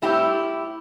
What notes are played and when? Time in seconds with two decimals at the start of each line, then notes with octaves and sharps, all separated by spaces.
0.02 A2 G3 C4 E4 G4